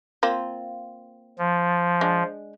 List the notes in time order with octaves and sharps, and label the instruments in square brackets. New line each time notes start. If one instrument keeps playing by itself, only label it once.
[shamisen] A#3 C4 F4
[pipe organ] F3
[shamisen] G#3 D4